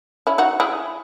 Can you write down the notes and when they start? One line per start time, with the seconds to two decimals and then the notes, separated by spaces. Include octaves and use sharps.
0.27 C#4 E4
0.38 D#4 F#4
0.60 E4 G#4